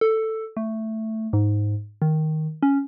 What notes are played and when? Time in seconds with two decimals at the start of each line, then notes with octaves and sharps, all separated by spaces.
0.01 A4
0.57 A3
1.33 G#2
2.02 D#3
2.63 C#4